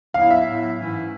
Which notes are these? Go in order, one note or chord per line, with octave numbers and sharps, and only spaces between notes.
A2 F#3 B3 E4 F5
E5
A2 F#3 B3 E4
G#2 E3 A3 C#4 E4